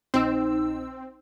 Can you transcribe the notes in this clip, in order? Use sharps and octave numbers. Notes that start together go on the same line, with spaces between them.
A#1 C4 D#4 E6